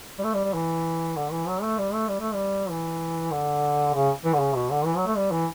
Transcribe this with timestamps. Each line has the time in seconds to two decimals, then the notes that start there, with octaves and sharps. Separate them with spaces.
0.19 G3
0.23 A3
0.34 G3
0.44 G3
0.54 E3
1.16 D3
1.31 E3
1.47 F#3
1.62 A3
1.78 G3
1.93 A3
2.08 G3
2.20 A3
2.33 G3
2.70 E3
3.31 D3
3.94 C#3
4.24 E3
4.34 D3
4.39 C#3
4.55 B2
4.70 D3
4.85 E3
4.96 F#3
5.06 A3
5.16 G3
5.31 E3